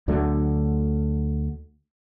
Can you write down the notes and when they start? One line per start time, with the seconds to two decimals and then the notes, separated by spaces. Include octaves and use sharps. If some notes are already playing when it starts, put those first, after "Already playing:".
0.08 D2 D3 F#3 A3